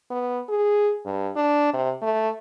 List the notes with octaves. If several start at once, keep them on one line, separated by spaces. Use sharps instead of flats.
B3
G#4
G2
D4
C3
A3